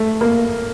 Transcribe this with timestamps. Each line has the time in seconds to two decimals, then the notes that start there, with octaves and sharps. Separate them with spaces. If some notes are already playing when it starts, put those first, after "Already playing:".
Already playing: A3
0.21 A#3